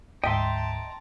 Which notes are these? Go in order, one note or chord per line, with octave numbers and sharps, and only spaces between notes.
D2 G#2 D#5 E5 G5 A5 A#5 C6